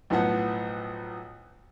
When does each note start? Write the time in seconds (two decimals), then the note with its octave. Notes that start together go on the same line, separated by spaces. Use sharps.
0.10 B1 A2 F3 B3 F#5